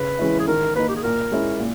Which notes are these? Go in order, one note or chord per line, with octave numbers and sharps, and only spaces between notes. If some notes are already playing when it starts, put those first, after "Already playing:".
Already playing: C#3 B4
E3 G#3 C#4 E4
G#4
D#3 A#4
A#3 D#4 B4
G4
G#4
A#2 A#4
G#3 C#4 E4
A#2